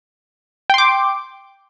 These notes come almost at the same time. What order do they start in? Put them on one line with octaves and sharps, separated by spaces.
G5 C6 D6